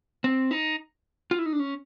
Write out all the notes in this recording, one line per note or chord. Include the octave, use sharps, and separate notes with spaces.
C4
D#4
F4
E4
D#4
D4
C#4